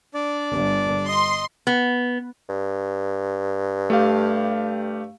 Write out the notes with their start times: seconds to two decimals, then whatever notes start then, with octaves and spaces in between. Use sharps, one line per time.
0.14 D4 D5
0.52 G1
1.08 D#5 C6
1.67 B3
2.49 G2
3.90 A3 G4 F5